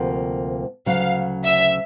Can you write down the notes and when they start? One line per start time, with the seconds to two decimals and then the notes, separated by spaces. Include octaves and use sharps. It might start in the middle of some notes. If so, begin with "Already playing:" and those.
Already playing: D2 C3 F3 A#3
0.86 D2 C#3 F#3 F5
1.45 E5